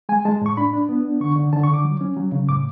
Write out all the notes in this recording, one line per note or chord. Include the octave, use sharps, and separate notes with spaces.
G#3 G#5
G#3 A5
A2 C#6
D4 B5
D4
B3
D4
D3 C#6
D3
D3 A5
C#6
D3
D6
F#3
C#4
F#3
C#3
A2 D6